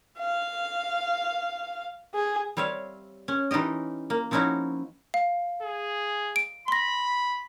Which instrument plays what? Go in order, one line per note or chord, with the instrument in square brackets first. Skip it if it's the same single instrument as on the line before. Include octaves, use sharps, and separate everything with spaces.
[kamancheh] F5
G#4
[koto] G3 C4 C#5 E5 F5
C#4
E3 D#4 F4 G4 D#5
A#3
F3 C4 C#4 D#4 E4 F#4
[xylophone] F5
[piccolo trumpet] G#4
[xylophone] D7
[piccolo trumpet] B5 [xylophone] C6 A#6